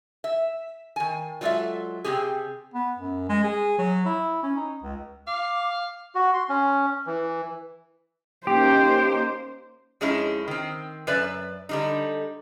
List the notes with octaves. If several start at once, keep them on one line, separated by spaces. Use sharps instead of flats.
E5
D#3 G#5
F#3 G#3 F4 A4 D5 E5
C3 F#3 C4 G4 G#4
B3
F#2
G#3
G#4
F#3
E4
C#4
D#4
C#2
F5 D6
F#4
C6
C#4
E3
A#3 C#4 D#4 G4 C5
F2 G#3 C#4 D#4 E4
D#3 C4
F#2 B4 D5 E5
D3 G3 D#4